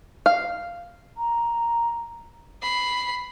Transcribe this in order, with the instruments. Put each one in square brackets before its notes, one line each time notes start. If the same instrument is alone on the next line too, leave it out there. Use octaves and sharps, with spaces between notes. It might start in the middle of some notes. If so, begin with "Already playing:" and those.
[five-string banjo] F5
[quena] A#5
[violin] B5 C7